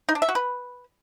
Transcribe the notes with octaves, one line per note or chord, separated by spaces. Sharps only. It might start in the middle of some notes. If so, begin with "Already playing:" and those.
D#4
D4
E5
F#4
B4